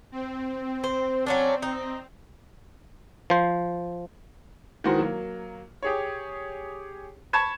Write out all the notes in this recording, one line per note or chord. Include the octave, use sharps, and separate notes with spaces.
C4
C5
F#3 C#4 D4
D#4
F3 C5
D#3 E3 G#3 F#4 A#4 C5
F#3 A#3
G4 G#4 C#5
A5 B5 C#6 G#6 E7